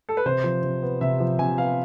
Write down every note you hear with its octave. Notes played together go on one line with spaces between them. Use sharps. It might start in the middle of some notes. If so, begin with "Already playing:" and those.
A4
B4
C3 C5
F3
C3
B3
C3 E5
F3
C3 G#5
B3 F5